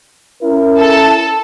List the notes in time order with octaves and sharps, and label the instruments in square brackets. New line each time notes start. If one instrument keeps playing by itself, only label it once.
[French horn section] C#4 E4 A#4
[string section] A4 A5